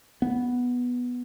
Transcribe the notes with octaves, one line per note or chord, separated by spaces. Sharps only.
B3